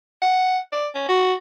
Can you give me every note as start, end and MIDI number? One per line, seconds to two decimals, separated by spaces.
0.22 0.58 78
0.72 0.87 74
0.95 1.05 61
1.08 1.33 66